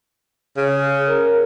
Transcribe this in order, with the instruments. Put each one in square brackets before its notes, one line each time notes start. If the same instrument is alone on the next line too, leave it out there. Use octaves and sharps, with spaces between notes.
[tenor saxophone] C#3
[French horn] A#4